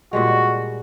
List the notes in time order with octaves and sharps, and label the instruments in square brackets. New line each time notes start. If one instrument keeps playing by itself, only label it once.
[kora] A#2 G3 G#3 [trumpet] F#4